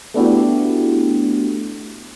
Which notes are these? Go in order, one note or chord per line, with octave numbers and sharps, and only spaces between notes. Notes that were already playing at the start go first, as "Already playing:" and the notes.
A3 B3 D4 E4 F#4 G4